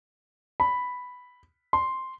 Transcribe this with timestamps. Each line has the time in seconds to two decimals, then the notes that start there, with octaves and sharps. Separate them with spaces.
0.60 B5
1.73 C6